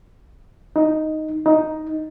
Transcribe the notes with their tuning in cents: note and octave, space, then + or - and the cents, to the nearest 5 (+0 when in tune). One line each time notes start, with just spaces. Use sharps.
D#4 +0
D#4 +5